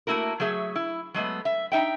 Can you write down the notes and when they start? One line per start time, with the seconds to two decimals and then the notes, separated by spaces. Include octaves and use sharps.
0.07 A3 A#3 E4 F#4 A#4
0.40 F#3 A3 G#4 E5
0.75 E4
1.14 F#3 G#3 A3 B3
1.45 E5
1.72 D#4 E5 G5